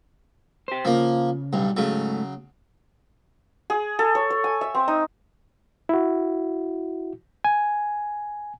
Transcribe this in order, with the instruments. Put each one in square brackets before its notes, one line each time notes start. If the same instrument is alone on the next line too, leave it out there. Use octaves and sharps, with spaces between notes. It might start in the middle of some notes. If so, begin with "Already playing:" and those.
[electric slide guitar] G4 C5
[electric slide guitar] C#3 [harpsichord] F3 A#3
[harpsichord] B1 G2
[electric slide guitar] G#2 A3 [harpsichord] C#3 F#3
[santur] G#4
A4
C#5
C#5
G#5
E5
C4
D#4
[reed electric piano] E4 F#4
G#5